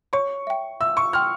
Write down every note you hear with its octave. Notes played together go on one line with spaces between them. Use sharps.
C#5 C#6
E5 G5
E5 E6
C#6
G5 C6 E6 F6